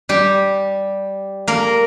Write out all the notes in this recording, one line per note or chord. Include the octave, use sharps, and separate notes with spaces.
G3 G4
A#3 A#4